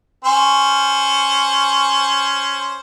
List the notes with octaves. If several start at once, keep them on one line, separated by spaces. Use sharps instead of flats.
C#4 C5